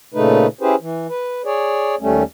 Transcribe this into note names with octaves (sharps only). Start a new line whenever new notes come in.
A#2 C#3 A3 D#4 B4
C#4 E4 G4 G#4 B4 C5
E3
B4
G#4 C#5 D5
D#2 G3 A3 C#4